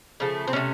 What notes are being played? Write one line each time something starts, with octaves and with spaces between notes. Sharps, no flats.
C#3 F3 A3
C4
C3 F3 A3 C#4